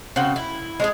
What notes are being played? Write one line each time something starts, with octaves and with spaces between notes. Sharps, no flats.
C#3 C4 F#4 G5
E4
G#3 D4 G#4